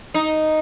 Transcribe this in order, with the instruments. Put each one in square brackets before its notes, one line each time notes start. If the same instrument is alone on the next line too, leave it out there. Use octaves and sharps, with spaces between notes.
[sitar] D#4